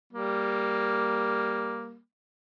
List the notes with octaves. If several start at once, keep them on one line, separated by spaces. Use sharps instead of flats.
G3 A#3